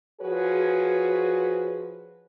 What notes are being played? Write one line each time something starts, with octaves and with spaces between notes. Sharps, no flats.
F3 F#4 G#4 B4 C#5